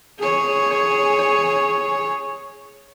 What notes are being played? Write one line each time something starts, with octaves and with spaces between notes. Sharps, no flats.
G#4 C#5